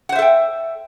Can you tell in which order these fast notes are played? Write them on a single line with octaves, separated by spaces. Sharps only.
F#5 C5 E5 A4 G5